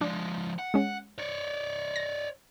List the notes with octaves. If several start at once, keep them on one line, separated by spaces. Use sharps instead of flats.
F3 G#3 D4
F#5
G#3 C#4
C#5 D5
A#6